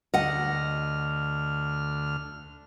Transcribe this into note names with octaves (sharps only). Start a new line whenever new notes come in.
D2 D#5 F#5 F6